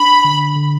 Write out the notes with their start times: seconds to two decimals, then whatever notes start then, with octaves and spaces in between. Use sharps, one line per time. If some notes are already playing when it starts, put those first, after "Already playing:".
Already playing: D4 B5
0.24 D3
0.56 D3